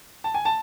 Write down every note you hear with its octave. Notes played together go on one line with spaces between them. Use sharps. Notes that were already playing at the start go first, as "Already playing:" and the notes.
A5
G#5
A5